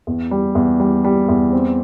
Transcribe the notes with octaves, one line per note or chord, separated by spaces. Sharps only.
E2
G3
E2
G3
G3
E2
C4